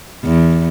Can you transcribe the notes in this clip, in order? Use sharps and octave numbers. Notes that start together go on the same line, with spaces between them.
E2